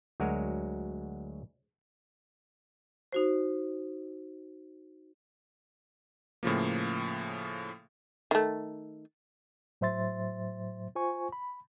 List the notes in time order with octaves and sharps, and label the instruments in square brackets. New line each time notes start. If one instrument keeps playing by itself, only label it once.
[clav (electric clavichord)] D2 F#3 G#3 F#4 A#4 C#5
[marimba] D#4 F#4 C5
[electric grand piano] A2 C#3 F3 A#3
[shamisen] D#3 A3
[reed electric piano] A2 F#3 C5 E5 C6 A6
F4 C5 G#5 C#6
B5